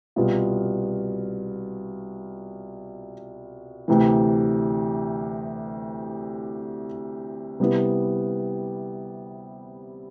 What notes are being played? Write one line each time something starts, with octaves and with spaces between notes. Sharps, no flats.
C2 B2 B3 F4
D2 C3 E3
C3 G3 B3 E4